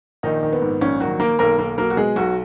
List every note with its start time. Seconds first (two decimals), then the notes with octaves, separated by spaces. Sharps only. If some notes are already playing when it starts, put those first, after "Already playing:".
0.23 A#1 D#3 D#4
0.43 D#3
0.52 B3
0.62 G#2
0.81 A#1 C#4
1.00 D#3 F#3 F#4
1.20 D#3 A#3 A#4
1.39 B1 A#3 A#4
1.58 B1 A#3 A#4
1.78 F#3 A#3 A#4
1.90 F#4
1.97 B2 G#3 G#4
2.16 B1 F#3 F#4